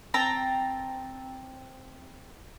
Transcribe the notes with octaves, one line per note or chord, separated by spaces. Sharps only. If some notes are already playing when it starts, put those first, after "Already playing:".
C4 G5 A5 A#5